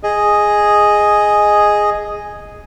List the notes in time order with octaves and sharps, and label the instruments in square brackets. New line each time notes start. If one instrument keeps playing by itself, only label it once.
[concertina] G#4 D#5